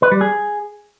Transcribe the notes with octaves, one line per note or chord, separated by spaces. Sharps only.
B4
G3
G#4